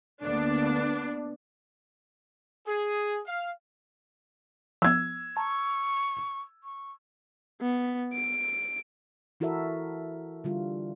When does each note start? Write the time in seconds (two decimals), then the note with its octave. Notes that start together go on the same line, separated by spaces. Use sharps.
0.24 D2 D3 A#3 B3 D4
2.67 G#4
3.27 F5
4.82 F3 B3 E6 G#6
5.37 A5 A#5 C#6
6.64 C#6
7.61 B3
8.13 D7
9.40 E3 E4 F#4 A4 A#4 E5
10.44 D3 G3 F4